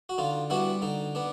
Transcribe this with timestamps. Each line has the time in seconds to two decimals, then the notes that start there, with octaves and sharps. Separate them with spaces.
0.09 F#4
0.18 D3 D#4 F4
0.50 G3 B3 D4 E4 F#4
0.82 D3 D#4
1.15 B3 D4